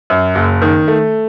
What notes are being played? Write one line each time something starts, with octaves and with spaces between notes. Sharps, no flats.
F#2
F#1
D#3
A3